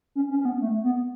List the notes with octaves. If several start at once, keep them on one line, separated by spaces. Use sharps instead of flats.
C#4
C#4
C#4
B3
A3
B3